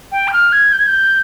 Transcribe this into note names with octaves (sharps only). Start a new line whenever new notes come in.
G5
G6
F6
G#6
G6
G#6
G6